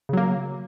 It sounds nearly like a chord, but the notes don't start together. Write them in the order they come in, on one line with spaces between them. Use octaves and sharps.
C#3 F#3 A#3